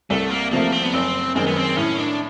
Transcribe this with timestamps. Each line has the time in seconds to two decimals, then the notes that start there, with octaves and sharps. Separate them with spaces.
0.10 C2 A3
0.30 A#3
0.51 C3 F3 A3 A#3
0.72 C4
0.84 B3
0.93 F#1 C4
1.35 F#2 D#3 G#3 C4
1.47 B3
1.56 C4
1.77 A2 C#4
1.98 D4